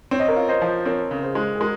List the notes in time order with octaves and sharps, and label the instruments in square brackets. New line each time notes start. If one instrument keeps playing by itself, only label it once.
[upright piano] C4 [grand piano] C#5
[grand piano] D#5
A#4 C#5
[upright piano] F4
[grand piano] C5 D#5
[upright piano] F3
[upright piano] C4 [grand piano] A#4 C#5
[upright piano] C#3 [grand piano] A#4
[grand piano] G#4 C5
[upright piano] G#3
[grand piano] G#4
[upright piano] G#3 [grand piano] F#4 A#4